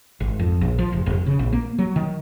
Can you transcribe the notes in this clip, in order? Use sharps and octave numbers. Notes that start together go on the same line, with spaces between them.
G#1
F2
A#1
F3
F1
F1
C#3
A#1
A#3
F#3
D#3